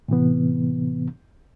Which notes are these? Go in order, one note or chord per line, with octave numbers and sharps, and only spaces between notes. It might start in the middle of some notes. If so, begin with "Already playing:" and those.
A2 C3 E3 B3